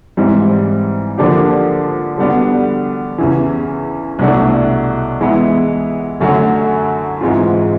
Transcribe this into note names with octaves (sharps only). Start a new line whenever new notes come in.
G#2 E3 G3 C4
D3 F3 A#3 D4 G4
D3 G3 B3 D4 F#4
E2 C#3 E3
C2 B2 F#3 A3 D4
E3 G#3 B3 E4
F#2 D3 F#3 A3
G#2 E3 G#3 C4 F4